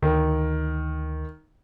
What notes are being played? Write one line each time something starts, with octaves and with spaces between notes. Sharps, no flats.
D2 D#3